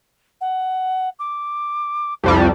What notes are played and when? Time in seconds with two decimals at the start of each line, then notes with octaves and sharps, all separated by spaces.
0.41 F#5
1.19 D6
2.23 C2 F2 G3 A5